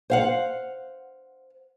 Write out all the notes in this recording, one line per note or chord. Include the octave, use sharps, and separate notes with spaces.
C5 F5 F#5